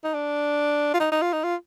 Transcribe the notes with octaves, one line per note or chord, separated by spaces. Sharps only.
D#4
D4
F4
D#4
D#4
F4
D#4
F4